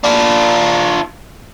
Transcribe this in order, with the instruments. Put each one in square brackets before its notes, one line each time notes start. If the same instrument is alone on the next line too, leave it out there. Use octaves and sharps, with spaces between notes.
[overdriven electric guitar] D4 F4